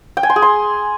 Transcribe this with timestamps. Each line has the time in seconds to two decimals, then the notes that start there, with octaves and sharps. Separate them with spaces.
0.17 G5
0.23 G#5
0.30 C6
0.36 G#4
0.42 C6